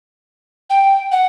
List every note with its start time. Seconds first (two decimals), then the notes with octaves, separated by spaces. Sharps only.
0.70 G5
1.12 F#5